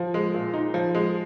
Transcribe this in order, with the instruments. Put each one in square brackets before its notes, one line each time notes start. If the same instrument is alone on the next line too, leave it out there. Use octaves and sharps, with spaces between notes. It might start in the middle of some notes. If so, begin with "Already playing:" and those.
Already playing: [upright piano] F3
G#3
A#2
D#4
F3
G#3